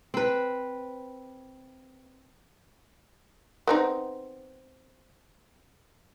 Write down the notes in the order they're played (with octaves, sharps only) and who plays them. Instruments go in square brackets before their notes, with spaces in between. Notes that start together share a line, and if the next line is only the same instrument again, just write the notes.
[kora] C4 B4
[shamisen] B3 C4 D#4